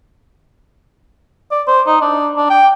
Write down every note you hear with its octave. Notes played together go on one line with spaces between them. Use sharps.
D5
C5
D#4
D4
D4
G5